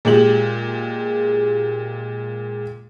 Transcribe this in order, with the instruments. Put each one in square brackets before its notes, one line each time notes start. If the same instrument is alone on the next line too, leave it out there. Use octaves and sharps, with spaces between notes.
[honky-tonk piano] A#2 G#3 G4 F#7